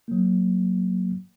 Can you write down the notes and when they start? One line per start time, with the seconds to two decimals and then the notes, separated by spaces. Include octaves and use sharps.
0.08 F#3 A#3